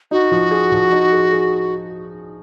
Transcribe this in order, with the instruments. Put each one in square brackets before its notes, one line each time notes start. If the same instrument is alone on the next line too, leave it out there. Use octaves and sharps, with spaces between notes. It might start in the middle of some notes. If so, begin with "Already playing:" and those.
[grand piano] D#4 [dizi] F#4
[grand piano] F3
G#4
F3
D#4
G#4
G#4